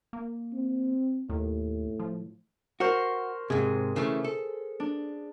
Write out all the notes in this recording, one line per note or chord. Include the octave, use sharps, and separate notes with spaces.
A#3
C4
D#2 A2
F3
F#4 A#4 C5 C#6
G#2 C3 G#4
C#3 E3 A3
A4
D4